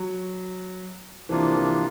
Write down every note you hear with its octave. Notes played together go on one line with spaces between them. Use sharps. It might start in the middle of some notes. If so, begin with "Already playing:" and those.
Already playing: F#3
C3 E3 F3 A#3 D4 F4
E3